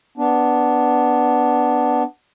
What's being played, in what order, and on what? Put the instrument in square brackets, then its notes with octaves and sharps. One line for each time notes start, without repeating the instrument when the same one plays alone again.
[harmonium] B3 D4